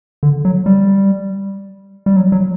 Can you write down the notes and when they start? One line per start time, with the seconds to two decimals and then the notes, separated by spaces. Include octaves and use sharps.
0.23 D3
0.45 F#3
0.66 G3
2.06 G3
2.16 F#3
2.32 F#3